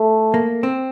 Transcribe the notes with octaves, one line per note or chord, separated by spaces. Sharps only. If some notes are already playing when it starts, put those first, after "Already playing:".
Already playing: A3
A#3
C4